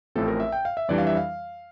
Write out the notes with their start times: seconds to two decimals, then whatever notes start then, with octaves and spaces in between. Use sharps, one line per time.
0.15 A1 A2 F3 A3 C4 A4
0.28 A#4
0.40 E5
0.52 G5
0.65 F5
0.77 E5
0.89 F2 E3 G3 D4 D5
0.98 F5
1.07 E5
1.17 F5